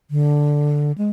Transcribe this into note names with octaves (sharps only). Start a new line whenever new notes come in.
D3
G#3